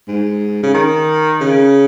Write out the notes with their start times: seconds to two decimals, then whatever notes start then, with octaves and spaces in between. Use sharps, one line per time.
0.08 G#2
0.63 C#3
0.74 D#3
1.41 C#3